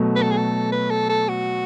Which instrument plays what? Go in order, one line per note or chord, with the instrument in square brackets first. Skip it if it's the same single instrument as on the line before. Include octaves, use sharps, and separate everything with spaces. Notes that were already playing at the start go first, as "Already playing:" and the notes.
Already playing: [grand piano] B2 F#3 A3
[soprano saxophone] B4
A4
G#4
A4
B4
A4
A4
F#4